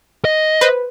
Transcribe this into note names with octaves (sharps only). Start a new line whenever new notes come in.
D#5
B4 C5